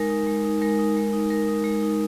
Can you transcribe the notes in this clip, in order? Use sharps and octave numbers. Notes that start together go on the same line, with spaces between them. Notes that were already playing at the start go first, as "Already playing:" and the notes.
Already playing: G#3 D#4 A#4
D#4
G#3
D#4
G#3 A#4
D#4
G#3
D#4
G#3 A#4
D#4
G#3
D#4